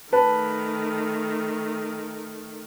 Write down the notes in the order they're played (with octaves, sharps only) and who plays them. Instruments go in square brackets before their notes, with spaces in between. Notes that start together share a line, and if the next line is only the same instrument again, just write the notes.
[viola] D#3 A3 [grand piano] B4 A5